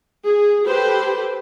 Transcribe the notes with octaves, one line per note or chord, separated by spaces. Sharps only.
G#4
G4 A4 B4 C5